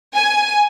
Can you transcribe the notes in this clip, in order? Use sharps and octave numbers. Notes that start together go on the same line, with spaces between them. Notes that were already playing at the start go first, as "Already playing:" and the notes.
G#5